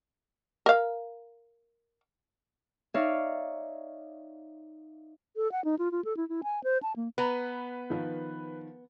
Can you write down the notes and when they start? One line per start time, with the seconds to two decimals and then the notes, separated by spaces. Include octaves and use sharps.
0.66 A#4 F5
2.94 D#4 C#5 D5 E5 F5
5.36 A4
5.52 F#5
5.65 D#4
5.79 F4
5.92 F4
6.05 A4
6.17 E4
6.29 E4
6.43 G#5
6.64 C5
6.83 A5
6.96 A#3
7.18 B3 B4 A#5
7.90 D#3 F3